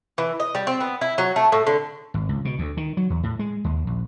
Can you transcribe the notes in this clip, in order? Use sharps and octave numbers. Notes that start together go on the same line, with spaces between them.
E3
D#5
G3
C4
B3
E4
F#3
A3
A2
D3
G#1
C#2
B2
D2
D#3
F#3
E2
A2
G#3
D#2
A#1